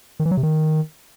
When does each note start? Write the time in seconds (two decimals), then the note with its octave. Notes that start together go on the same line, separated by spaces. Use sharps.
0.20 D#3
0.25 E3
0.31 F#3
0.37 C3
0.43 D#3